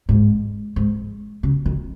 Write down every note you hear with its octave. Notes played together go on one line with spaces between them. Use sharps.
G#2
G#2
C#3
D#3